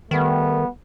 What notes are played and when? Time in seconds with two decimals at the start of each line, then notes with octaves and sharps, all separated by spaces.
0.11 D#3 G3 A3 B3